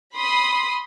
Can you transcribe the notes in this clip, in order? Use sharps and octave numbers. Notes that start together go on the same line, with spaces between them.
B5 C6 D#6